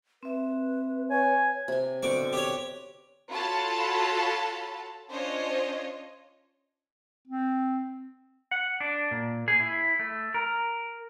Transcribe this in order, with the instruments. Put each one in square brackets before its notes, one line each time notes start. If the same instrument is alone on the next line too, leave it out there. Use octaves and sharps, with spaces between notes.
[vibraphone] C4 E5 [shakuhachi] B4
[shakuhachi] B4 [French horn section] C#5 [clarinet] G#5
[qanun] C3 G#5
[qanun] B2 D3 C4 [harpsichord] C#6 D6
[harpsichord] G4 C#5
[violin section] F4 F#4 A4 C#5 A5 B5
C#4 D4 F4 C5 C#5 D#5
[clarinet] C4
[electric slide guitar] F#5
D4
A#2
G#4
E4
A3
A#4